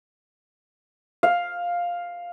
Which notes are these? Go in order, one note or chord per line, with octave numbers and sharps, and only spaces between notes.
F5